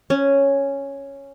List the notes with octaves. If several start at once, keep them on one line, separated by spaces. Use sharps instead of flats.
C#4